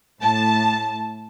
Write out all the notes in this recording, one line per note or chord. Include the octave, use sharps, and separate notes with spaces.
A2 A5